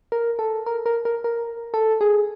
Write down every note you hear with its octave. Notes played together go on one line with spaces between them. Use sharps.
A#4
A4
A#4
A#4
A#4
A#4
A4
G#4